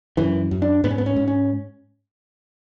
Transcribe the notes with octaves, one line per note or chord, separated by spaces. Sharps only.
F#2 E3
F#2
D4
G#2 B3
C#4
B3
C#4
G#2
C#4